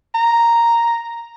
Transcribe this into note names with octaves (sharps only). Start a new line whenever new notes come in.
A#5